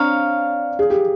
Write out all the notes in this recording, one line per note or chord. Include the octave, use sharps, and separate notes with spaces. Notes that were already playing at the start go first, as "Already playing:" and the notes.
Already playing: C4 D4 C#5 F5 A#5
G#4
G4